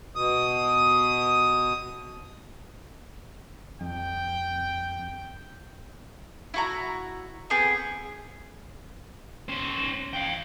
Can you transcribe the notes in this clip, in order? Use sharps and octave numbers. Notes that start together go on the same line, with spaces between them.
B2 D#6
F2 G5
E4 F#4 A#5
B3 C4 G#4
C#4 C5
F5 G5